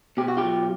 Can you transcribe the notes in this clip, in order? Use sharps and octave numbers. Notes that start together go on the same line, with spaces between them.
B2 G4
F#4
F4 G4
F#3